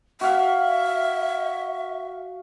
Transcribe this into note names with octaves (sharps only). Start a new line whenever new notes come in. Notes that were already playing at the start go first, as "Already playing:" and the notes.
F#4 E5 F5